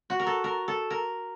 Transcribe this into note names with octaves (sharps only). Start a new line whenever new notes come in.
F#4
A#4
A4
A#4
A4
A#4